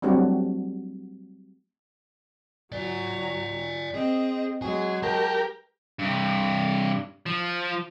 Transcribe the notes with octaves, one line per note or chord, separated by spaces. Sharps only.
F#3 G3 A3 C4 D4 F#4
F#3 D5 G#5 A#5
C4 G#4 D#5
F#3 G#3 G#4 G#5
G4 A#4 A5
G2 C3
F3